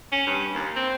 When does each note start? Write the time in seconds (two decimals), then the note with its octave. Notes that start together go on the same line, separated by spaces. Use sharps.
0.12 C#4
0.27 G2
0.54 D#2
0.76 C4